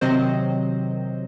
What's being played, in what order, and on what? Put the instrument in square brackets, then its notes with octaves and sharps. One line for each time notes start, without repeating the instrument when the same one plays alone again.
[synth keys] C3 D#3 F#3 C4 C5 D#5